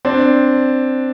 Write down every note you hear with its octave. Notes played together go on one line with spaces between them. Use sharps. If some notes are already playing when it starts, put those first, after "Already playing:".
C4 D4